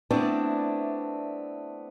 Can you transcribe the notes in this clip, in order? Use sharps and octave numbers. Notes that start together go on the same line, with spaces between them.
A3 B3 C4 D4 E4 D5